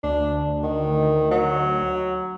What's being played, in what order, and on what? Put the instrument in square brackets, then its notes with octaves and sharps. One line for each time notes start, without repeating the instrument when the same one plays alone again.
[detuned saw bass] D2 [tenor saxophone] D4
[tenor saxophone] D#3
F#3